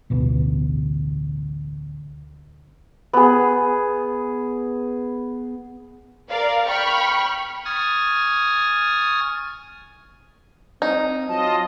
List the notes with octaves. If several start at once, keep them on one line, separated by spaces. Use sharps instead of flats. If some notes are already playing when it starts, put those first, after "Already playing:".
A1 D2 B2
B3 G#4
A#4 D5 F5
G5 B5 C#6 F6
G#5 C#6 D#6 F6 G#6 A6
C4 D#4
F#3 F4 D#5 A5